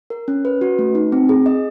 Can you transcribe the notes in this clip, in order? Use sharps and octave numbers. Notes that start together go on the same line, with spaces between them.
A#4
C#4
B4
F#4
A3
D#4
C4
G#4
D#5